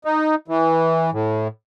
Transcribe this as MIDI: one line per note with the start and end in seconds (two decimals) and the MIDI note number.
0.05 0.35 63
0.48 1.10 52
1.13 1.48 45